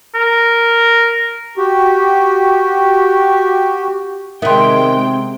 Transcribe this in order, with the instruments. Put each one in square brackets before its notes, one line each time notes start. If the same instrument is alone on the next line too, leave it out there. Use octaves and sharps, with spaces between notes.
[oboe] A#4
[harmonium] F#4 G4
[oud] C3 B3 [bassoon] D#3 [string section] G#3 G5 [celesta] E5 C6